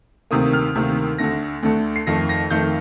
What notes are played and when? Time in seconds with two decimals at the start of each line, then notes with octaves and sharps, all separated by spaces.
0.31 D2 C3 D#3 A#3 D#6
0.53 F6
0.75 D2 C3 D#3 A#3
1.19 D2 D3 A3 A#6
1.63 D2 D3 A3
1.96 C7
2.07 F2 D#3 A3 A#6
2.29 A#6
2.50 F2 D#3 A3 G6